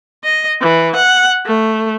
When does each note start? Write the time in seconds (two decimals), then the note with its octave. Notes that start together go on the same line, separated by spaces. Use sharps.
0.24 D#5
0.61 E3
0.95 F#5
1.46 A3